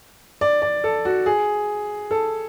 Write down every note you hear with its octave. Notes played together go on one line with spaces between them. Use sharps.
D5
D5
A4
F#4
G#4
A4